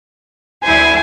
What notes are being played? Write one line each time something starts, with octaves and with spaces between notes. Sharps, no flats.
D2 E4 C5 G#5